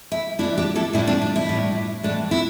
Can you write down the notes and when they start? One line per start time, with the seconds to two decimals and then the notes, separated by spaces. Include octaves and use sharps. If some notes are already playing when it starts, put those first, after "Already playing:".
0.12 E4
0.39 E3 G3 D4 E4
0.58 D4 G4
0.76 E4 A4
0.93 A2 G3 D4 E4
1.07 D4
1.21 D4
1.36 E4
1.49 A2 G3 D4
2.03 A2 E3 A3 D4
2.31 E4